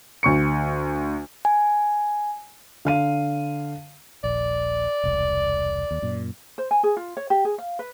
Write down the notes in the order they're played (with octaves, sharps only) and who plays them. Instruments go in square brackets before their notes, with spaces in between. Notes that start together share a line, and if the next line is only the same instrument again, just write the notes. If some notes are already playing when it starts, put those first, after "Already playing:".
[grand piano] D2 C#6 C#7
[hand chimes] G#5
[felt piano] D3 F5 D#7
[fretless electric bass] D#1 A#1 [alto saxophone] D5
[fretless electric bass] E1 C2
D#2
F#2 A#2
[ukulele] C5
G#5
G#4
F4
C#5
G4
G#4
F5
B4